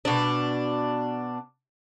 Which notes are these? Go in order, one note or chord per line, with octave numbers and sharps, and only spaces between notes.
B2 D4